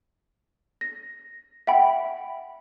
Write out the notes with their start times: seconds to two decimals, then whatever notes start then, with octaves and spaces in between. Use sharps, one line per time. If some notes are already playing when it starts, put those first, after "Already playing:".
0.81 A#6
1.67 E5 F#5 G5 B5